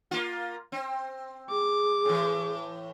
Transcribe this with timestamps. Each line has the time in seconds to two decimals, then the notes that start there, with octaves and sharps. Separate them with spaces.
0.11 A#3 F4
0.72 C4
1.51 G#4 D6
2.05 A2 E3